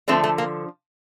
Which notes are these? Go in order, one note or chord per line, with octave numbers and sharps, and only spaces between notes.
D3 F3 A3 C4
A3
A#3